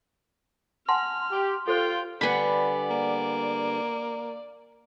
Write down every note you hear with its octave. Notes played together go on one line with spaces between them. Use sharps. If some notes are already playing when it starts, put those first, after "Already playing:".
F#5 G#5 A5 C6 F6
G4
F4 A4 C5 G5
D3 G3 B3 D5 F#5 G#5 B5
A#3